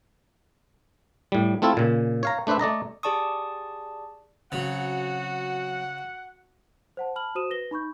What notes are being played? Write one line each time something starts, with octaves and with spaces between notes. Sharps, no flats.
A2 G3
A3 C4 E4 F4 A4
A#2 C#3
C#5 F5 A#5
A3 D4 B4 C5 E5
A3 D5 D#5 A#5
G4 G#4 D5 A5 C#6 D#6
C#3 F#3 C4 F#4 F#5
C5 F#5 A5
A5 B5 F6 F#7
F#4 C5 D#6 D#7 E7
B4 A#6 G7
D#4 B5 C#6 G6